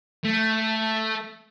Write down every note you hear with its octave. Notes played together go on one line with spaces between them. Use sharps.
A3